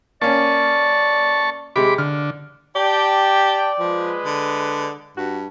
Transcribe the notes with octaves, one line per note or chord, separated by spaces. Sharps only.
A#3 C#4 D5 A5 C#6
C3 G#3 B5 D6
D3 F6
G4 D5 G5 A5
F3 G#3 B4
D3
G2 F#4